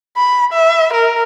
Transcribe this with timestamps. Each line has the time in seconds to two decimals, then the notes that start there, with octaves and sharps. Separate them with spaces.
0.17 B5
0.52 E5
0.93 A#4